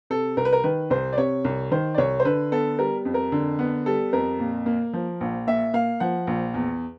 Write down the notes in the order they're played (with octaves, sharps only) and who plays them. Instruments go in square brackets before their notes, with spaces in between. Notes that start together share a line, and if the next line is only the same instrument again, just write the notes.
[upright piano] C3 A4
C2 A#4
B4
A#4
D#3 B4
C2 C5
D5
C3 C#5
C2
D#3 C5
D5
C2 C#5
C5
D3 B4
B3 A4
G3 A#4
F2
A#4
D3
B3
G3 A4
F2 A#4
A#2
A#3
F3
A#1
A#2 E5
A#3 F5
F3 F#5
A#1
E2